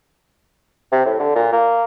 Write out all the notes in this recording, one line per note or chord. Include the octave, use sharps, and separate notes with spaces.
C3
A2
D3
A#2
A#3